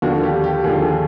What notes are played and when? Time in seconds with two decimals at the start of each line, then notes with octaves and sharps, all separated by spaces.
0.02 D#2 D3 F3 F#4
0.23 G4
0.44 G4
0.64 D#2 D3 F3 G#4